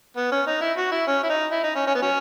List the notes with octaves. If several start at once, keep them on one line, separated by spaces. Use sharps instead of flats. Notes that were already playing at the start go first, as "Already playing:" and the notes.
B3
C#4
D#4
E4
F#4
E4
C#4
E4
D#4
E4
D#4
C#4
C#4
B3
F#3 C#4